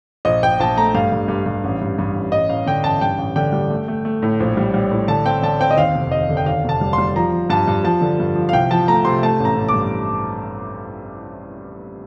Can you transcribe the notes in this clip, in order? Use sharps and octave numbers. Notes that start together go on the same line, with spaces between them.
A#1 D#5
A#1 G5
A#1 A5
A3 A#5
G2 F5
G2
G2
G2
A1
G2
G2
A1
A1 D#5
A1 F5
D3 G5
A1 A5
G2 G5
A1
D3 G5
G3
A3
A3
A3
A2
A#1
G3
G3
A2
D3 A5
C4 G5
D3 A5
C4 G5
D#5
D#2 F5
F1
D#2 D#5
D3
G5
D#2 F5
F1 A5
G3
C6
G3
F3 A#5
F3
G2 A5
G2
F3 A5
D3
G2
F3
F5
C2 G5
F3 A5
A3 A#5
C3 C6
A3 A5
A1
A#5
A1
D6
G2